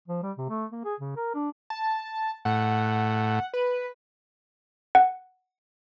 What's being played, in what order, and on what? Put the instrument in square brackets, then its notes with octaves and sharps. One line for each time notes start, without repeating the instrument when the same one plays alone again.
[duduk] F3
G3
C3
A3
A#3
G#4
C#3
A#4
D4
[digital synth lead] A5
[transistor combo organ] A2 [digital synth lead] F#5
[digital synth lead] B4
[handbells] F#5